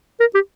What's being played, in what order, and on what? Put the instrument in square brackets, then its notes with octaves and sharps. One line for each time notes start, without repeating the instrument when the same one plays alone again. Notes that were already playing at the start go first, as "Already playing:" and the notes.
[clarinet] A#4
G4